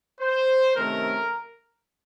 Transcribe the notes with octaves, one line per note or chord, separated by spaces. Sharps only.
C5
C3 D#3 A3 C#4 A#4